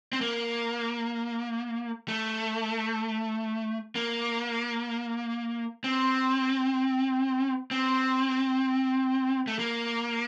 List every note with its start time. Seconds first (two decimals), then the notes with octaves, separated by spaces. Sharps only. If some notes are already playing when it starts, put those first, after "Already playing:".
0.13 C4
0.21 A#3
2.08 A3
3.95 A#3
5.84 C4
7.71 C4
9.47 A3
9.59 A#3